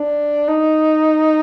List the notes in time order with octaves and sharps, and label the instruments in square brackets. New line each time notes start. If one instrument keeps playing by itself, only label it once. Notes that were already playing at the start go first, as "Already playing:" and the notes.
Already playing: [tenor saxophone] D4
D#4